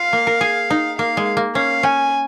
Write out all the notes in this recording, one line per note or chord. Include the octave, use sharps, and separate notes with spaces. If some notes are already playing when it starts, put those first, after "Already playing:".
Already playing: F4 F5
A#3
A#4
G#4
D#4
A#3 F5
G#3
A#3
C#4 F5
C#4 G#5